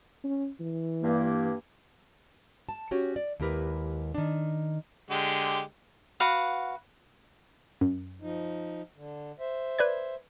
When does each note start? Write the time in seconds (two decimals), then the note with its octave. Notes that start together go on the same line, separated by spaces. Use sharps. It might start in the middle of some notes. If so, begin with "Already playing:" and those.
0.24 C#4
0.60 E3
1.02 G2 A#3
2.69 A5
2.91 C#4 F#4 G4 C#5
3.16 D5
3.40 D#2 G#3 E4 G4 A#4 B4
4.14 D#3 D4
5.11 D3 G#3 G4
6.20 F#4 B4 F5 F#5
7.81 F#2
8.22 F3 D#4
8.96 D3
9.40 C5 E5
9.79 B4 D5 G#6